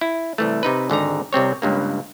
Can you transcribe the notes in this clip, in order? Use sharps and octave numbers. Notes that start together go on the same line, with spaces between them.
E4
C2 E3 A3
C3 D#4 B4
G#1 D3 D#4 A#5
C2 C3 C4 C#5
C#2 G2 A#3